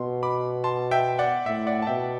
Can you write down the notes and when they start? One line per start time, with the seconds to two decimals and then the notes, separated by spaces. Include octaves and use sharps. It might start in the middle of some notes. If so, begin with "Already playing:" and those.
Already playing: B2 C6
0.23 B5 D6
0.64 A5 C6
0.91 E5 G5
1.19 D5 F#5
1.46 A2 E5
1.67 D5 F#5
1.82 A5
1.87 B2 E5 G5